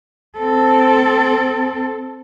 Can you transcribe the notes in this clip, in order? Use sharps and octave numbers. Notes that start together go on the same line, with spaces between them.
C4 A4